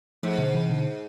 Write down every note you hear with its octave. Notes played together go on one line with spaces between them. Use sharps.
G#2 F3 A3
B2 D3
C3 E3
B2 D3